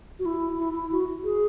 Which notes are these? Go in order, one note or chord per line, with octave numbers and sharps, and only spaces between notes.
F#4
E4
E4
E4
F#4
G#4